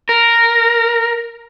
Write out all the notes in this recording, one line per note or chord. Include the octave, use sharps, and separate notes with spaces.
A#4